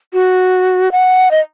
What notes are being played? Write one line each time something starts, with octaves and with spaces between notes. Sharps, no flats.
F#4
F#5
D#5